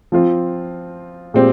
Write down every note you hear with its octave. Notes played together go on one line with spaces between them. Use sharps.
F3 C4 F4
A#2 G#3 C4 G4